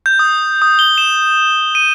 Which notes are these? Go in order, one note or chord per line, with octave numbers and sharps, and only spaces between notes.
G6
D#6
D#6
G7
E7
D#7